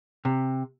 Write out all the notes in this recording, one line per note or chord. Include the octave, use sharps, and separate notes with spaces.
C3